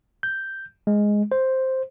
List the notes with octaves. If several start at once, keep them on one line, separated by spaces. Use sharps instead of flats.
G6
G#3
C5